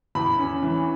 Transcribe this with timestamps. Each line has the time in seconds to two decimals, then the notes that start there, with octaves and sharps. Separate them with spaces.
0.15 E2 B5
0.39 C#4
0.62 E3